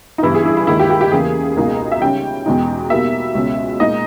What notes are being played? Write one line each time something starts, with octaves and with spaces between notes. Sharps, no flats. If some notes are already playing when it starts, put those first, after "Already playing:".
D#4
G2 E3 G3 B3 E4
G#4
E4
E4
D#2 D#3 G#3 E4
G4
G4
G4
E2 C#3 E3 A#3 G#4
C#2 B2 A#3 D#4
E5
C#3 G3 C#4 G5
E2 B2 G#3 D#4
B2 G3 A#3 E5
C#2 B2 G#3 C#4
A#2 G#3 D#4 D#5